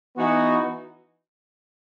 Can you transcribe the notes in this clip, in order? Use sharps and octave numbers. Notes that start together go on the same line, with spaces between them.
E3 B3 D#4 F#4